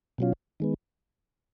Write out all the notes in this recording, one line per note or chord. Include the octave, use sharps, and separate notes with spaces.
B2 F#3 C#4 F4
D#3 G#3 B3